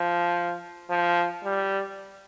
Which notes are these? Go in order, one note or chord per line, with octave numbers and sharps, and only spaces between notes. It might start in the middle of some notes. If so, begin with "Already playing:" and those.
Already playing: F3
F3
G3